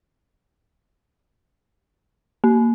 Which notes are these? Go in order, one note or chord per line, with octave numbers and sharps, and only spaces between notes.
A#3